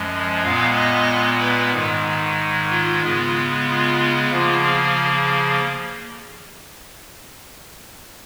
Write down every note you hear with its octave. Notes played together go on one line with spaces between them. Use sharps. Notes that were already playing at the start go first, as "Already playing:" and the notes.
Already playing: F#2 F3 G#3
A#2 G#3 B3 F5
D#5
B4
G#2 D#3 G#3
F4
C#3 G#3 B3
F4
C#3 F3 A#3 F4
G#4